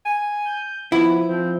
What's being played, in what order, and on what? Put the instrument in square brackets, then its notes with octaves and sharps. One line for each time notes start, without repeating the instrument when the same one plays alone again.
[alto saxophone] G#5
[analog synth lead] G6
[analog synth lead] F3 [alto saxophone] B3 [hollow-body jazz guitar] E4
[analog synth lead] F3 [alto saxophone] C4